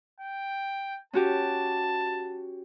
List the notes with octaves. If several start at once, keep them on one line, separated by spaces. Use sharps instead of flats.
G5
C#4 F#4 G4 A5